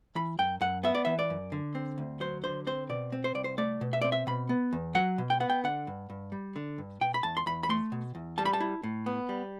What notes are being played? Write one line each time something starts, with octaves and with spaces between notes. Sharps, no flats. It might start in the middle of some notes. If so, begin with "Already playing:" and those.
E3 B5
F#2 G5
F#2 F#5
B3 E5
D5
E3 E5
D5
F#2
D3
C4
D2
F#3 C5
D3 C5
C4 C5
B2 D5
C4
C5
C2 D5
C5
A3 D5
B2
E5
C4 D5
E5
B2 B5
B3
E2
F#3 F#5
B2
G5
B3 F#5
G5
D3 F#5
G2
G2
G3
D3
G2
B2 G5
B5
E2 A5
C6
E2 B5
B5
A3 C6
B2
E2
G3 A5
B5
A5
E4
A2
B3
G3